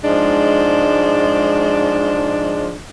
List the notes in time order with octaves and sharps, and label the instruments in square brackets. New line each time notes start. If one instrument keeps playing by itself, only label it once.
[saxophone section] G#2 F3 G#3 D4